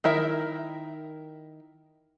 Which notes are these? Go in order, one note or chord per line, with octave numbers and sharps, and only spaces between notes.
D#3 E4 A#4 E5